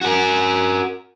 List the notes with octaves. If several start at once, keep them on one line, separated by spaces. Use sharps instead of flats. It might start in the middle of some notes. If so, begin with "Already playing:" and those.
F#4 A#4